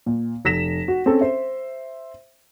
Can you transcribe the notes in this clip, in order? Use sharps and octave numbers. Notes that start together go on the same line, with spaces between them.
A#2
F1 A#6 B6 E7
F#4
C4 C#4 A4
C5 E5